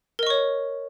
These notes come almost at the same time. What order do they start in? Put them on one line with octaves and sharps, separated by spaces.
A#4 D#5 C#6 C#5